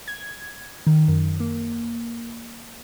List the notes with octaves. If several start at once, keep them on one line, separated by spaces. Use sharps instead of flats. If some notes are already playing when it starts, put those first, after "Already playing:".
G#6
D#3
F#2
A#3